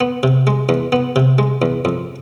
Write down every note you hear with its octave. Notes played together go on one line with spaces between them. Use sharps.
B3
C3
G#3
E2
B3
C3
G#3
E2
F2